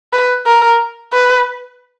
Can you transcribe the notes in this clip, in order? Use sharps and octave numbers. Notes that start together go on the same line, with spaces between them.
B4
A#4
B4